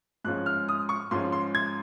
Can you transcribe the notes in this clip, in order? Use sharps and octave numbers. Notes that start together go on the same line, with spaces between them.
G#2 F3 G#3 C#4 F#6
F6
D#6
C#6
G#2 F3 G#3 C#4 C6
C6
G#6